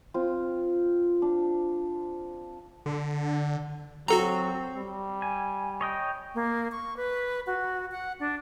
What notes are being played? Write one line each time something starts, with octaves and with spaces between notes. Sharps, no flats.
C4 F4
D4
D3
F#3 C4 F#4 A4 A#5
G3
G#5
C#5 D#5 G5
A#3
C#6
B4
F#4
F#5
D4